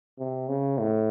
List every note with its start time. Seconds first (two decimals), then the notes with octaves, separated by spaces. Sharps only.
0.19 C3
0.48 C#3
0.78 A2